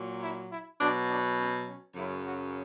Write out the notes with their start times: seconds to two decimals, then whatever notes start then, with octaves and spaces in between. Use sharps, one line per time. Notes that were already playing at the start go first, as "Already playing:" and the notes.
Already playing: A#2 F#3
0.21 E4
0.50 E4
0.79 B2 F#3 D4
1.08 D4
1.38 C#4
1.66 C#4
1.95 F#2 C#3 F#3 E4
2.24 F#4